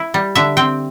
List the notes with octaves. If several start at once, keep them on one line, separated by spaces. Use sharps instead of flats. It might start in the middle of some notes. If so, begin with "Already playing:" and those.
Already playing: E4
G3
D3 E5
C4 G5